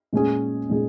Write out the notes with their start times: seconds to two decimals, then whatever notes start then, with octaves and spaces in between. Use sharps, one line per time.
0.13 A#2 G#3 C#4 G#4
0.70 A#2 G#3 C#4 G#4